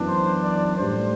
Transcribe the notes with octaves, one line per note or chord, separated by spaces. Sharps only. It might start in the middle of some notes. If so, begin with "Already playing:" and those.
Already playing: F#2 E3 B3 D4
C5
D5
A2 G3 D4 C5